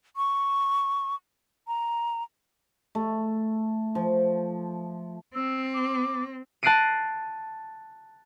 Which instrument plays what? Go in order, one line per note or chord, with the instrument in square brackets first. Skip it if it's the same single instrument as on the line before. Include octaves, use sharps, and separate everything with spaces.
[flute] C#6
A#5
[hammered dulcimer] A3
F3
[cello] C4 [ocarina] E6
[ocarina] D6
[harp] A5 F#6 A#6 C7 D7 D#7